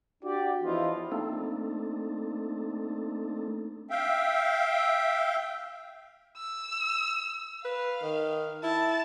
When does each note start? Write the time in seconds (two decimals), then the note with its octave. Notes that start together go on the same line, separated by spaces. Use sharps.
0.23 D4 F#4 G4 D5
0.63 E2 F3 E4 F4 D#5
1.12 A3 A#3 C4 D4 D#4 A4
3.90 E5 F5 G5
6.37 E6
7.65 B4 F5
8.02 D#3
8.63 E4 A5